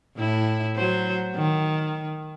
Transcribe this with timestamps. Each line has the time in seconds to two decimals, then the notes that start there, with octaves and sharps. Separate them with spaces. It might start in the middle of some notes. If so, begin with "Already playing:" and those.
0.17 A2 E4
0.75 F#3 C5
1.35 D#3